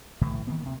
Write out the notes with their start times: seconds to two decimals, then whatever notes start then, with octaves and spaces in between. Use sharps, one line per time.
0.21 B1 A2 D3 E3
0.47 D#3 E3 A#3 B3
0.64 D2 C3